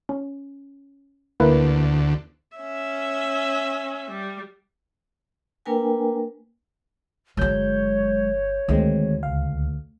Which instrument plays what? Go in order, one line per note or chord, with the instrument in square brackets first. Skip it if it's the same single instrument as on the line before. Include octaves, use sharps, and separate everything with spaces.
[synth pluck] C#4
[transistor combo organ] D2 [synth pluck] A#3 E4 B4
[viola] C#4 E5
G3
[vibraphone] A#3 D4 A#4 B4 G5 G#5
[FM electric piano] G1 G6 [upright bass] F#3 G#3 [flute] C#5
[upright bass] D2 [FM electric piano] D#3 G#3 C4
[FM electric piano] C#2 F5